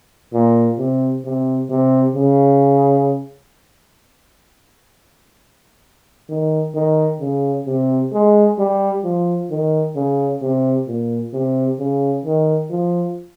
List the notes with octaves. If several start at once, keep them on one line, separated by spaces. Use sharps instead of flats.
A#2
C3
C3
C3
C#3
D#3
D#3
C#3
C3
G#3
G3
F3
D#3
C#3
C3
A#2
C3
C#3
D#3
F3